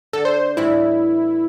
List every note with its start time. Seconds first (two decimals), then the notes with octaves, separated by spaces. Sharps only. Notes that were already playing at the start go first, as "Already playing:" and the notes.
0.13 D3 A4
0.25 C5
0.57 A2 E3 G3 E4